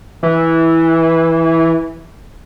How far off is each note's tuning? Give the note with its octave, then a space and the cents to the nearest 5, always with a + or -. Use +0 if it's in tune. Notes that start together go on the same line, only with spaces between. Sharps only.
E3 -10